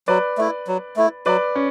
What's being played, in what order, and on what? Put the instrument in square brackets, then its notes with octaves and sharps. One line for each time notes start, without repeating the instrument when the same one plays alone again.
[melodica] F#3 [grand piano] B4 D5
[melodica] A3 E4
F#3
A3 E4
[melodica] F#3 [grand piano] B4 D5
[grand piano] C#4